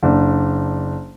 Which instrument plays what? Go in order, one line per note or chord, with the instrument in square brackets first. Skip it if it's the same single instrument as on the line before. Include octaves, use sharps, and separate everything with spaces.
[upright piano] F#1 D4